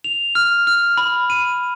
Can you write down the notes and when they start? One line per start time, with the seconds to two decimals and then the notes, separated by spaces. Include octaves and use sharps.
0.04 F7
0.35 F6
0.67 F6
0.97 B5
1.30 D#7